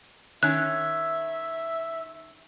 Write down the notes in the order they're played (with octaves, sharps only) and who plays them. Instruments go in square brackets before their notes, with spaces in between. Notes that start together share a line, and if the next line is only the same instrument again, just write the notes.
[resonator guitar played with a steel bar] D#3 C#4 [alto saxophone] E5 [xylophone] F#6